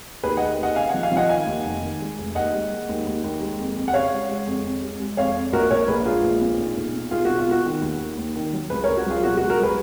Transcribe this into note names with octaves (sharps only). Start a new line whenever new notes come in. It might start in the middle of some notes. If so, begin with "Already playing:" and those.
D#2 G#4 B4
D#2 D#5 F#5
D#2 D#5 F#5
C#3 F5 G#5
F3 D#5 F#5
F5 G#5
F3
D#5 F#5
D#3 F5 G#5
D#2
F1
D#3
G#3
F1
D#2 D#5 F#5
G#3
G#3
D#2
D#2
D#2
G#3
F2
F2
F#5
C#3 C#5 F5
G#3
G#3
F2
F2
G#3
G#3
F2 C#5 F5
F2
A#1 F#4 A#4
A#1 A#4 C#5
A#1 G#4 B4
G#3 F4 G#4
A#1
A#2
B1
B1
B2
B1 F4 G#4
B2 F#4
F4
B2 F#4
D#3
D#2
D#2
D#2
D#3
F#3
C#2 G#4 B4
C#2 A#4 C#5
F#4
F#3 F4 G#4
B2 F#4
F#4
C#2
F#4 A#4
F#3 G#4 B4